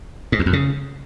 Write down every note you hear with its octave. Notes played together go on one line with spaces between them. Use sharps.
G#2
E2
F2
C#3